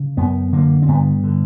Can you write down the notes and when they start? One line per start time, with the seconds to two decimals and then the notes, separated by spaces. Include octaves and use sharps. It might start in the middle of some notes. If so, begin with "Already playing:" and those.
Already playing: C#3
0.17 F#2 B3
0.52 D3 A#3
0.82 C4
0.88 G2 B3
1.24 D3